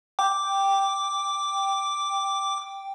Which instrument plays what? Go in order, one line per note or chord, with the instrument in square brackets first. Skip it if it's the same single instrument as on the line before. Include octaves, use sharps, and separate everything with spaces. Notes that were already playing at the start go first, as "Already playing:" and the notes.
[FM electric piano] G5 [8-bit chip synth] D6